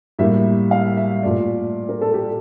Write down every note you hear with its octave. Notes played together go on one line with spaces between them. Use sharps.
A2 G3 A#3 E5
F5
E5
A#2 A3 D5
A#4
A4
G4